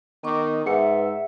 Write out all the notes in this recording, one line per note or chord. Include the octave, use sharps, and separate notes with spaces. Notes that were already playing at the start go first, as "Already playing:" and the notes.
D#3 B3 D#5 C#6 D6
G#2 G#4 B4 E5 F#5 C#7